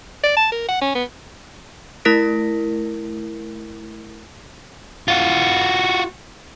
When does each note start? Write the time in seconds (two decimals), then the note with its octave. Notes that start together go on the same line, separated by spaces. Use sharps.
0.24 D5
0.37 A5
0.52 A#4
0.69 F#5
0.82 C#4
0.95 B3
2.05 A3 E4 A#4 A#6 B6 D7
5.08 F4 F#4